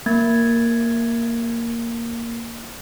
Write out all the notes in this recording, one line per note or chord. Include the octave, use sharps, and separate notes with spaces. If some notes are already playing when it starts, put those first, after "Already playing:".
A#3 G#6 A6